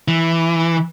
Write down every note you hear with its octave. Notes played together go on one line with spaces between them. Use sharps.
E3